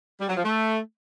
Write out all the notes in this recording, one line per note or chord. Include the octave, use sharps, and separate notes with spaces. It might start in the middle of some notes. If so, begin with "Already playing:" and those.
G3
F#3
F3
A3